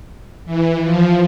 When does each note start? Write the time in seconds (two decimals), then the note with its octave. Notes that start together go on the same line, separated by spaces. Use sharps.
0.46 E3
0.82 F3